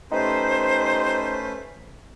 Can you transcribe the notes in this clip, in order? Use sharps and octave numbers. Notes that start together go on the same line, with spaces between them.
A3 C#4 D#4 G4 B4 C5